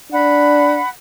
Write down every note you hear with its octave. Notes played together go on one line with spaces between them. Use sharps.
D4 F#5 B5